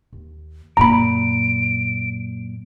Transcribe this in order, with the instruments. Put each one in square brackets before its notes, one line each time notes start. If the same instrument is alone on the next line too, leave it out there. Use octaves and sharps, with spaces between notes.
[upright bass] D#2
[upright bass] F#2 A#2 [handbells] A#5 B5 [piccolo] D7